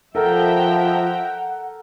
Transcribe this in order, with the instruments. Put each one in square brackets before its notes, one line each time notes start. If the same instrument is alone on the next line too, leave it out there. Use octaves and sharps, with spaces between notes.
[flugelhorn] F3 [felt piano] A4 A#4 [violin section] E5 G5 A#5 [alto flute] F#5